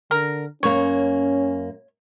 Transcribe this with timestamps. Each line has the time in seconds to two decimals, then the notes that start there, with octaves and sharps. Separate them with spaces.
0.11 D3 A#4
0.63 F#2 A#3 C#4 C#5